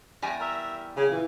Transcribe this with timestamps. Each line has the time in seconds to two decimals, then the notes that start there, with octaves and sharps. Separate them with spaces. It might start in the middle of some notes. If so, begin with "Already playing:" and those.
0.22 E2 G3 G#5
0.41 A#4 E5
0.95 C#3
1.09 A#2 E3